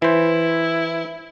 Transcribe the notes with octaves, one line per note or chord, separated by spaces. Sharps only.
E3 E4 C5